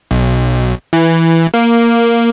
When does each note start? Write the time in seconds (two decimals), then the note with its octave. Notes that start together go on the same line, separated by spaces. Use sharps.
0.11 B1
0.93 E3
1.54 A#3